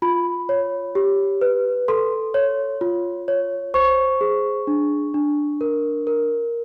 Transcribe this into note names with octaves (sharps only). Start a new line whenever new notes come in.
F4 B5
C#5
G4
B4
A4 C6
C#5
F4
C#5
C5 C#6
G#4
D4
D4
A#4
A#4